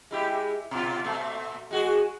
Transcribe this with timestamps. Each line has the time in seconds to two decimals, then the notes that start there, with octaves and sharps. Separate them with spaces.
0.11 G#3 E4 G4
0.71 B2 F4
1.04 A#2 A3
1.71 G#3 F#4 G#4